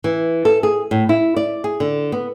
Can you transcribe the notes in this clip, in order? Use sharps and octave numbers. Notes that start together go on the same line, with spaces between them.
E3
A4
G#4
A2
E4
D5
G#4
D3
B3